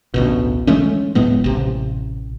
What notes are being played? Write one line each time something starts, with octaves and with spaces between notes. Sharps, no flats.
A1 D2 B2
E3 G#3 A3 C#4
D1 A2 G#3 B3
A1 C3